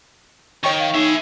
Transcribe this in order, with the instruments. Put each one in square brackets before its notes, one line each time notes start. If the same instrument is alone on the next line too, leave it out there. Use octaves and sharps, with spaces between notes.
[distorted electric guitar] D#3 [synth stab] C#5 G5 C#6
[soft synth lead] F5
[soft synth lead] D#4 [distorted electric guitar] G#4 E5